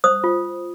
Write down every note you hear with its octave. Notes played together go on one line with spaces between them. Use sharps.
C5 D#6
F4